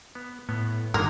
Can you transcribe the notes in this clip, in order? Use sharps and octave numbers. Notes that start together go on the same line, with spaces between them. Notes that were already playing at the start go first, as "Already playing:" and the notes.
B3
A2 B3
G2 D#3 G#3 A#3 A#4